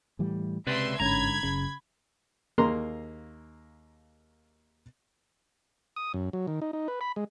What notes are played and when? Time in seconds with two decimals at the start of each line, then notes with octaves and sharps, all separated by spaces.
0.19 A2 E3 G3
0.67 C#2 C3 B4 D5 E5 C6
1.00 A1 G#2 D3 C#4 A#5 B5 G#6
1.43 F#1 C#3
2.58 D#2 A#3 G#4 A#5 C6
5.96 D#6
6.14 F#2
6.33 F#3
6.47 D#3
6.62 D#4
6.73 D#4
6.88 B4
7.01 B5
7.16 G#3